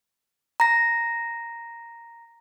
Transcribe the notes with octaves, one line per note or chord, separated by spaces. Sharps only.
A#5 A#6